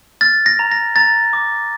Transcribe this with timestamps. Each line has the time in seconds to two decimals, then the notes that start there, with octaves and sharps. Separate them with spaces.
0.21 F6 A6
0.46 A#6
0.59 A#5
0.72 A#6
0.96 A#5 A6
1.33 D6